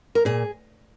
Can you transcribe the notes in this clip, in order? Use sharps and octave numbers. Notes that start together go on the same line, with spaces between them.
A#4
A#2 G#4